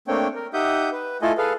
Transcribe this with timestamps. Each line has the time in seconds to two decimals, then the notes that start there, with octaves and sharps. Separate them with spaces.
0.08 A3 A#3 C4 D4 C#5 G5
0.36 A#4
0.53 D#4 G4 E5 F#5 D#6 G6
0.92 B4
1.22 A3 E4 F4 A4 D#5 G#5
1.38 G#4 A4 B4 F5